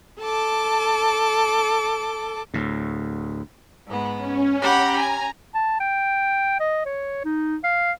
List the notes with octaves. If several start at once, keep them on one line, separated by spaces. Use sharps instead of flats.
A4 A5 D6
D2 A2
G#2 B3
C#4
G4 F#5 A#5 B5
G#5
A5
G5
D#5
C#5
D#4
F5